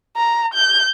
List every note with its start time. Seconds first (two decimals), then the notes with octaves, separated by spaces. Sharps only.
0.16 A#5
0.54 G6